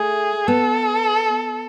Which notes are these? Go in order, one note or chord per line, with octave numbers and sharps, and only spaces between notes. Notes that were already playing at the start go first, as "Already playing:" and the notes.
Already playing: A3 G#4
B3 A4